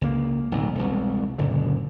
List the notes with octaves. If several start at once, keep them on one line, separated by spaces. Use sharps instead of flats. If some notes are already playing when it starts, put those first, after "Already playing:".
C#2 A#3
D1 B1
E1 C2
F#1 A#2 D3